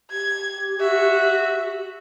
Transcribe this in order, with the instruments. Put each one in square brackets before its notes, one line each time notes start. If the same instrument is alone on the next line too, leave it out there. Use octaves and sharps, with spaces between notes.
[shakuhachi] G4 [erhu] G#6
[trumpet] F#4 [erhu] E5